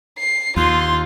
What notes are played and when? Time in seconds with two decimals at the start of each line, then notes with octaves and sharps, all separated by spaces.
0.19 C7
0.57 D#2 F4 C6